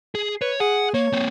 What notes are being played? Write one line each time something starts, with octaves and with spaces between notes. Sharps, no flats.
G#4
B4 C#5
G#4 F#5
A#3 C#5
A#3 C4